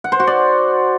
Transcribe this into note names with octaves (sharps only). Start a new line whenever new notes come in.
F#5
C5
F#4
D5